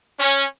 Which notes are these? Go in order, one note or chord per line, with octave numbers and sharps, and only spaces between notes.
C#4